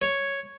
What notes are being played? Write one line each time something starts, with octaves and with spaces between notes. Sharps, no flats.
C#5